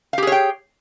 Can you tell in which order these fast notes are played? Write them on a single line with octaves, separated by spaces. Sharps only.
F5 G4 G#4 C#5 G5